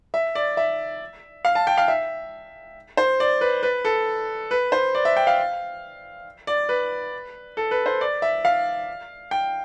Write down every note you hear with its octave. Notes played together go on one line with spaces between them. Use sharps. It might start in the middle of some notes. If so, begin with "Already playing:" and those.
E5
D5
E5
F5
A5
G5
F5
E5
C5
D5
B4
B4
A4
B4
C5
D5
E5
G5
F5
D5
B4
A4
B4
C5
D5
E5
F5
G5